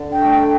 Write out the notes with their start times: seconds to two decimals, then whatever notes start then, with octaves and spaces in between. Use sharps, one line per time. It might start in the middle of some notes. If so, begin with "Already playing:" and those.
Already playing: D3
0.12 G5
0.22 A3 D4
0.32 G5